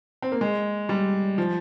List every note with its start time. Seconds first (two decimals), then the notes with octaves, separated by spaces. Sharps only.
0.22 C4
0.32 A#3
0.41 G#3
0.89 G3
1.38 F3